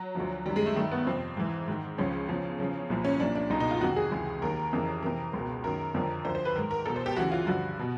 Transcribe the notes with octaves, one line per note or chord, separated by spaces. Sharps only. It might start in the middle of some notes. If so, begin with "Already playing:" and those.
Already playing: F#3
D2 D3 F3
F#2 D#3 G3
G#3
A3
G2 D#3 A3
B3
F2 C3 F3 C4
G#2 E3
G#2 D#3
C#2 C#3 F3 C#4
E2 C#3 F3
E2 C#3 F3
C2 A#2 F3
C#4
C2 A#2 F3 D4
D4
C#2 B2 D#4
D#4
F4
F2 C3 D#3 F#4
G#4
C#2 C3 E3
D#2 D#3 A#4
F2 C#3 E3
F2 C3 E3 A#4
C#2 B2
F#2 D#3 A#4
F2 D3 F3
D2 D3 F3 C5
C5
B4
G#2 D#3 A#4
A#4
E2 B2 A4
C5
G4
D2 C#3 E3 F#4
F4
G2 D3 F3 F#4
B2